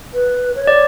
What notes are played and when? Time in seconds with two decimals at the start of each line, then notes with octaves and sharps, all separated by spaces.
0.14 B4
0.55 C#5
0.67 D5